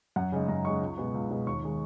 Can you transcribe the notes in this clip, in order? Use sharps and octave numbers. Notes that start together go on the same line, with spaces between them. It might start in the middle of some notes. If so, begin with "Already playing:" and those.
F#2 F#5
C#3 G#3 D#4
F#2 A#5
C#3 G#3 D#4 C#6
C#2
B2 G#3 B3
C#2
B2 G#3 B3
D#2 C#6
D#3 G#3 D#4